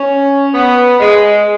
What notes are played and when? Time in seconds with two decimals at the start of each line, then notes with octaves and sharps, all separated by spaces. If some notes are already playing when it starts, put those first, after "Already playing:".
Already playing: C#4
0.54 B3
1.00 G#3